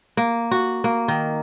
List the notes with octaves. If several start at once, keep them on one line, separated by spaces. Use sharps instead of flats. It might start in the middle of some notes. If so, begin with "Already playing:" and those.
A#3
F#4
A#3
D#3